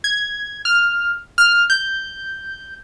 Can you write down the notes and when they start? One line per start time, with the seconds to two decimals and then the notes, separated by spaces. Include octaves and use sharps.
0.04 G#6
0.65 F6
1.38 F6
1.70 G6